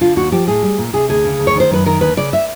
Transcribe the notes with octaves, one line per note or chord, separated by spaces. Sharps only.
D3 F4
D#2 F#4
F3 G4
A2 G#4
G3
A#2
C3 G#4
D2 G#4
C#3
D2
C#5
D#3 C5
F#2 B4
D#3 A#4
D#2 B4
C#3 D5
E5